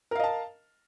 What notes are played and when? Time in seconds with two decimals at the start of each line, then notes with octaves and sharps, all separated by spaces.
0.11 A#4
0.15 F5
0.20 D#5
0.24 A5